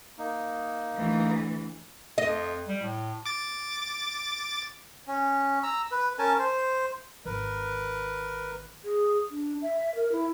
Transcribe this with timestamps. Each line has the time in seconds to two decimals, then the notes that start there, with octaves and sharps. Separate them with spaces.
0.18 A#3 D#4
0.97 D2 E3
2.18 F2 D#5
2.68 G3
2.83 A2
3.25 D6 A6
5.08 C#4
5.63 A#5 E6
5.92 B4
6.19 C#4 A#4 G#5 A5
6.39 C5
7.25 G#1 D#3 A#4 B4
8.84 G#4
9.31 D4
9.62 E5
9.95 A#4
10.12 E4